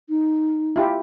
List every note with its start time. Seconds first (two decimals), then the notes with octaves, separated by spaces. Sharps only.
0.09 D#4
0.76 E4 F4 G4